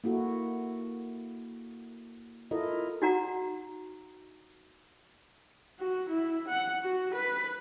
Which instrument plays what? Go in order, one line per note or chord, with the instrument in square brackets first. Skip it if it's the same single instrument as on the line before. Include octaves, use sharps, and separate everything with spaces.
[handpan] A#3 E4 F#4 A4
E4 F4 A4 A#4 D#5
[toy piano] D#4 F#4 D5 F#5 A#5
[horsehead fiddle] F#4
E4
F#5
F#4
B4